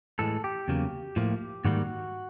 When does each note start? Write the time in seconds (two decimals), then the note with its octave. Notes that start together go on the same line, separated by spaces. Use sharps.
0.19 A2 E3 G#3 A4
0.44 G4
0.68 E2 C#3 F#3 A#3
1.16 A2 F3 A#3
1.65 G#2 D#3 G3 A#3 F#4